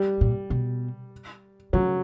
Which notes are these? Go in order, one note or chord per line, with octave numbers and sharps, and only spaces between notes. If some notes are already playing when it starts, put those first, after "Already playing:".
Already playing: G3
A#2
B2
C#3 F#3